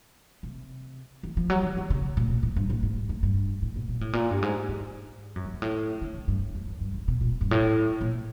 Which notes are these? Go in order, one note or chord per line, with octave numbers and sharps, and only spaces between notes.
C3
E3
F3
F#3
D#3
E3
C#3
A#2
A#2
A2
G2
A2
G#2
G#2
G2
A2
B2
A#2
A2
A#2
G2
G#2
G#2
F#2
G2
G#2
A2
D3
C#3
G2
F2
F#2
G2
G#2
B2
A#2
G2
A2
A#2